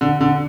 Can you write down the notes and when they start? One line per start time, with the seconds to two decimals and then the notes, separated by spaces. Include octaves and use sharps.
0.01 D3
0.21 D3